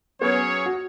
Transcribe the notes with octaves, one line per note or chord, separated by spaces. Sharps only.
F#3 B3 C#4 G#4 C#5
F#4